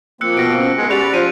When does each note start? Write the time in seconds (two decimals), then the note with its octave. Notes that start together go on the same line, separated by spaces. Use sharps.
0.21 F3 A#3 C4 E6 F#6 C#7
0.37 B2 A#6 D7
0.58 C#4
0.77 D#3 G#3 B3
0.90 F#4 G4 D5 B5 F#6 F7
1.14 F3 D#7